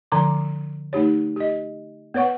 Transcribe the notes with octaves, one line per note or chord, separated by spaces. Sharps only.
D3 F3 A#5 C6 D6
A3 D#4 G4 C#5
G4 D#5
B3 B4 C#5 F#5 C#6